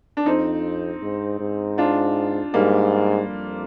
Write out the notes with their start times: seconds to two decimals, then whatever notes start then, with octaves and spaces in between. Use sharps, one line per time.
0.17 D4
0.26 F2 C4 D#4
1.02 G#2
1.40 G#2
1.78 D4 F4
2.54 G#2 G3 A#3
3.30 F2